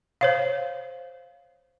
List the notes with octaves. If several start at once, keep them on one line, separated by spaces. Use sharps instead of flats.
C5 C#5 F5